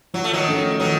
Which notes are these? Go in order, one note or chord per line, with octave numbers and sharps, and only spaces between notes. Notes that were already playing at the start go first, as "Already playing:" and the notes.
F3 F#3
A3
D#3 F#3
A3 C#4 A4
D#3 F3 F#3